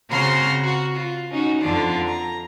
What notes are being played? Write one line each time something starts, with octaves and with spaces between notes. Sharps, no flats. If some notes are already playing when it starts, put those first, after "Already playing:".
C#3 C4 F#4 A#5 C6 F6
F#4
F4
C#4 D#4 F#4
F2 D3 F4 D5
A#5